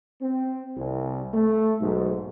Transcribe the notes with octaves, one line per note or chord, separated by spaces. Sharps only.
C4
C2
A3
B1 G#2